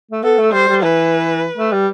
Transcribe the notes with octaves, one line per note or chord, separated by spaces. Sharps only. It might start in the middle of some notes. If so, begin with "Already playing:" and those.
A3
B3 A4
A3
G3 C5
G3
E3 B4
A3
G3